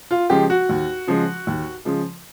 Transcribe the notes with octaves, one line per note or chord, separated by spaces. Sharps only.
F4
C#3 F3 G#3 G4
F#4
D#2
C#3 F3 G#3
D#2
C#3 F3 G#3